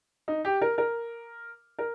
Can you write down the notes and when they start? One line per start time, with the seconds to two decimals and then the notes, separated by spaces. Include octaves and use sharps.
0.28 D#4
0.45 G4
0.61 A#4
0.78 A#4
1.79 A#4